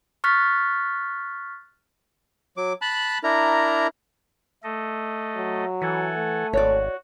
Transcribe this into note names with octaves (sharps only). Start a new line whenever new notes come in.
C#6 F6 F#6 A6 B6
F#3 D6
A5 B5 F#6
D4 E4 A#4 A#5
A3 A4 D#5
F#3
E3 A4 F#5 G#5
A3
G#1 F#4 C#5 D5